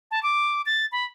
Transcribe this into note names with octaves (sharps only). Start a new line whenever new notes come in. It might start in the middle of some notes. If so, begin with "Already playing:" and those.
A5
D6
A6
B5